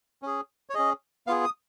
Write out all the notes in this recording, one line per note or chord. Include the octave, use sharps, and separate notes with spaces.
C#4 G#4
C#5
C#4 G#4 D#5
B3 F4 G#4 F5
D#6